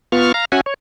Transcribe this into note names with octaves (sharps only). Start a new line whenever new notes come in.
B3 F4 C#6 F6
F5 A#5
C#4 F#4 E5 F#5 G#5
C#5